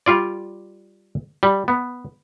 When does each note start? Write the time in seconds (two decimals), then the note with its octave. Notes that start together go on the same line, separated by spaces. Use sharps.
0.06 G3 F4 D5
1.43 G3
1.68 B3